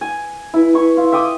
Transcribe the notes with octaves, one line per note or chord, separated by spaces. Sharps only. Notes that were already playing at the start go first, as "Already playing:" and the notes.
G#5
E4 B4
E4 C#6
F4
E5 G5 D6 D#6